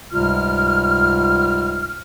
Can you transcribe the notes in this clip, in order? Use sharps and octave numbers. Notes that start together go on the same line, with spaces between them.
C#2 G#2 C3 G3 F4 F6